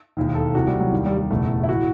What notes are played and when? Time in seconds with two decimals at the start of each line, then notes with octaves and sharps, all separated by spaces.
0.17 E1 D#2 D#3
0.35 A4
0.55 C2 C3 E3 F#4
0.67 G3
0.80 F#3
0.92 D#2 D#3 G3
1.06 G3
1.18 G3
1.31 F#1 E2 B2 A3
1.63 E4
1.69 A2 E3 F#4